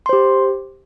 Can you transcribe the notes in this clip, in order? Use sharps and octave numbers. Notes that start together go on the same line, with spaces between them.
G4 C5 C6